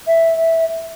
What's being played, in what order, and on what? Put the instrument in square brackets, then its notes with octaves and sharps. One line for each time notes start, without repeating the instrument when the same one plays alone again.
[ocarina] E5